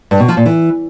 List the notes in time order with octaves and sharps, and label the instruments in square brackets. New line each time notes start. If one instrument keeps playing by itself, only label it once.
[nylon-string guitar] G2
B2
F3
A#2
E3